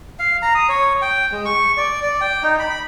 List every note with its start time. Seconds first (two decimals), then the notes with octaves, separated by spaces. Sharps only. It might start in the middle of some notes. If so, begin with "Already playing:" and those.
0.19 F5
0.43 A#5
0.55 D#6
0.69 C#5
1.02 G5
1.32 G#3
1.45 C#6
1.77 D5
2.03 D5
2.21 G5
2.43 D#4
2.59 B5